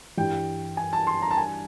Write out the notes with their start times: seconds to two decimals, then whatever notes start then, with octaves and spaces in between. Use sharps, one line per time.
0.17 G2 E3 G3 G5
0.77 G#5
0.93 A5
1.07 C6
1.22 A#5
1.31 A5
1.37 G#5